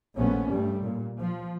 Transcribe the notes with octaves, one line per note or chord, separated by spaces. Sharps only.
A#1 A3 B3 C#4
G2 G3 A3
A#2
F3